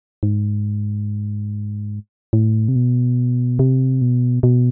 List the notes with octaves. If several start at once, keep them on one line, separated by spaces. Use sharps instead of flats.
G#2
A2
C3
B2
C3
B2
B2